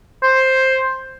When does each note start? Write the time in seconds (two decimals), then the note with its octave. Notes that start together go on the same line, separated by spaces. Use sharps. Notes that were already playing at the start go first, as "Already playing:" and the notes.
0.23 C5